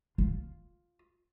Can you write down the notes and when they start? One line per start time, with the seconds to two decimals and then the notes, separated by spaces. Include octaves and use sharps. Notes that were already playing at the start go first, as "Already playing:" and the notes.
0.18 F4